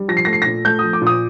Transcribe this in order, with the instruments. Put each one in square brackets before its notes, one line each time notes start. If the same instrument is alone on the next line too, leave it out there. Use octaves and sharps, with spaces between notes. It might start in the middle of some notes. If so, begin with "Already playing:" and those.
Already playing: [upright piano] G3
F3 A#6
C7
A3 A#6
C7
A#6
A#2
A3 G6
D#6
F3
D6
A#2
D#6